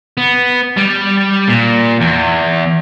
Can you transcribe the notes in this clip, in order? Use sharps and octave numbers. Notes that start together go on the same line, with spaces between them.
B3
G3
A#2
E2